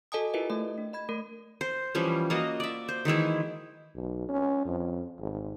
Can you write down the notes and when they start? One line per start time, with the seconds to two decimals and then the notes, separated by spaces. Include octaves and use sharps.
0.12 F#4 A4 D#5 G#5 A5 D#6
0.34 E4 F4 G4 A#4 B4 E5
0.50 A3 D#5
0.78 D4
0.93 D#5 B5 G#6
1.09 A3 A#4
1.61 C5
1.95 E3 F3 G3 C#4
2.30 A#3 F4 F#4 D#5
2.60 D5 E5
2.89 C5
3.05 D#3 E3 G#3 E4
3.96 B1
4.29 C#4
4.65 F2
5.20 G#1